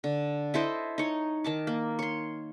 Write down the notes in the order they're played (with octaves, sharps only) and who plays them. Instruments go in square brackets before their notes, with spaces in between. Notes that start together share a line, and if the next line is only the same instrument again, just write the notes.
[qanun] D3
E4 A4 C5 D#5
D#4 C#5
D#3 A5 D6
A#3
C#5 C6